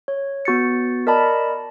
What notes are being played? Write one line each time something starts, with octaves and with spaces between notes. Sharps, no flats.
C#5
B3 F#4 A6 C#7
A#4 D5 D#5 A5 B5